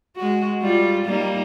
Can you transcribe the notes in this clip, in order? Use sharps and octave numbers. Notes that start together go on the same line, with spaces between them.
G#3 F#4
G3 F4
G3 A#3 D#4